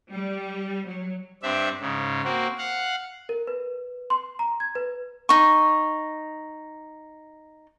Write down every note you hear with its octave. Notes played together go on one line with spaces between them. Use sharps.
G3
F#3
G2 C4 D4 E5
G#2 C#3
A#3 C4 F#4
F5 F#5
A#4
B4
C6
A#5
G#6
B4
D#4 C#6